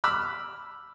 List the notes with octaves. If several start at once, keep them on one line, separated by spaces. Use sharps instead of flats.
B5 D6 E6 F6